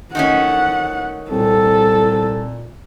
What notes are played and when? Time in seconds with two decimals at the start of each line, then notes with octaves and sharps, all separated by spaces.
0.15 D#3 A3 C#4 F#5
1.32 C2 A#2 A4